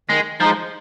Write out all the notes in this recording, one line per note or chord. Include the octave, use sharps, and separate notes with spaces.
D#3 G#3
F3 G#3 D#4